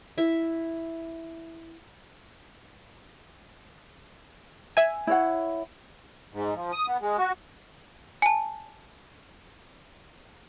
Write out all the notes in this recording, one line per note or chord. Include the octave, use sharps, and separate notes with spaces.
E4 E5
E5 G#5
E4 C#5 F#5
G#2
F3
D#6
B3
G#3
F#4
G#5 A5